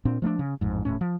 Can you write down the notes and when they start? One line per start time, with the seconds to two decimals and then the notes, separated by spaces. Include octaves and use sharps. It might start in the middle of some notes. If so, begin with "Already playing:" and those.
0.05 A#2 C4 D4
0.22 F3 A3 A#3 D4
0.39 C#3
0.61 A1 F2 G#2
0.85 D#1 B1 A2 C#4
1.01 F3